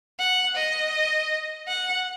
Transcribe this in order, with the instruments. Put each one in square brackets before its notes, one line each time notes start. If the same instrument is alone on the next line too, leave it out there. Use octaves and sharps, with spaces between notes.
[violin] F#5
D#5
F#5